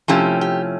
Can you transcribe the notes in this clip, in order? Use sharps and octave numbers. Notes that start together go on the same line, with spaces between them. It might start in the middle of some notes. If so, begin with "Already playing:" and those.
C3 F3 A3 C#4 E4 G4
G4